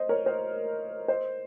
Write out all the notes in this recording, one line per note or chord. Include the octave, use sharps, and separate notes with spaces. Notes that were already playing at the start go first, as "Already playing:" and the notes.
Already playing: C5 D#5
A#4 C#5
C5 D#5
C5 D#5